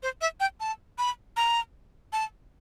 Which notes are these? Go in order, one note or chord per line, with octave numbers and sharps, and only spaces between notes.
C5
E5
G5
A5
B5
A#5
A5